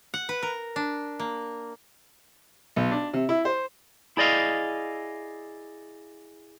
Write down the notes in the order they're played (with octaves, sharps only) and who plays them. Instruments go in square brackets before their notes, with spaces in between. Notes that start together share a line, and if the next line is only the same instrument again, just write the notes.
[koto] F#5
B4
A#4
D4
A#3
[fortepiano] B1
D4
C3
E4
C5
[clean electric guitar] E4 G#4 D5 D#5 F5